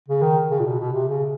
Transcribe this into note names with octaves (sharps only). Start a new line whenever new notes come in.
C#3
D#3
C#3
A#2
B2
B2
C3
C#3